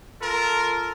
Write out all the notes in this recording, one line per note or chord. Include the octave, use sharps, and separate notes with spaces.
F4 A4 A#4